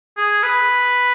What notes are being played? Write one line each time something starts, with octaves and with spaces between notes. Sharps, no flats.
G#4
B4